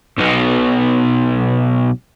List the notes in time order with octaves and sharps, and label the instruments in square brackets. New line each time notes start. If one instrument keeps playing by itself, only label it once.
[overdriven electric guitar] B1 B2